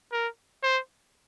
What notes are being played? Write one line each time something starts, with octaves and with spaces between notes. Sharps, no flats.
A#4
C5